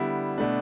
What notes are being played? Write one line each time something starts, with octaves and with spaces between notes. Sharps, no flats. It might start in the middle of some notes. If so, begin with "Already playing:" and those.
Already playing: D3 G3 B3 E4
B2 A3 D4